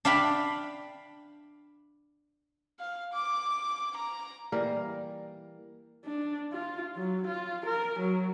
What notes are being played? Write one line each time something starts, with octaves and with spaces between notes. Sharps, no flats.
D4 F5 G5 B5
F5
D6
A#5
E3 G3 A#3 A#4
D4
F4
F#3
F4
A#4
F#3